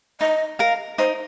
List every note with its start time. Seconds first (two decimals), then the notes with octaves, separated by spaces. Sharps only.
0.20 D#4 D#5
0.59 A#4 F5 A#5
0.98 D#4 C5